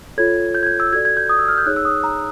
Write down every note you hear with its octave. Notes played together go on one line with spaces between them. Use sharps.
F4 A4 C#5 G#6
G6
G#6
G6
E6
F#4 A4 D5 G#6
G#6
G6
D#6
E6
F6
G6
D#4 G#4 C#5 F#6
E6
D#6
A#5